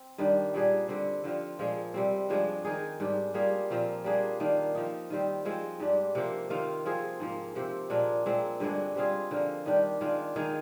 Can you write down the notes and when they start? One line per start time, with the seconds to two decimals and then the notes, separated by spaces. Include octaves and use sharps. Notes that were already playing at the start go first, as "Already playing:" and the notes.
Already playing: C4
0.18 G2 D#3 G3 D4
0.54 A#2 G3 D4 G#4
0.88 D3 G3 C4
1.24 D3 F3 C4 F4
1.59 A#2 F3 G#3
1.94 C3 G3 C4
2.29 G2 F3 G#3 D4
2.65 D#3 G#3 D#4 G#4
3.00 G#2 G3 D4 G4
3.34 G3 A#3 F4 G#4
3.70 A#2 F3 C4 F4
4.04 G3 A#3 D4 G#4
4.40 D#3 A#3 D4
4.75 F3 C4 D#4
5.10 D#3 G3 C4
5.45 F3 G#3 C4
5.79 G#2 G3 D4
6.15 C3 F3 A#3
6.50 C3 D#3 A#3 F4
6.85 F3 C4 F4 G#4
7.20 G#2 F3 A#3
7.55 C3 F3 C4 G4
7.90 A#2 G#3 D4 F4
8.26 A#2 G#3 C4
8.60 G2 D3 G#3 D4
8.95 G3 C4 F4 G#4
9.31 D3 F3 A#3 F4
9.66 D#3 G3 D4 G4
10.01 D#3 G#3 D4 F4
10.36 D#3 G#3 D#4 G#4